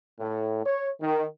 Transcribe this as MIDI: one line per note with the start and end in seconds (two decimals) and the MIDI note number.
0.20 0.63 45
0.65 0.88 73
1.01 1.25 51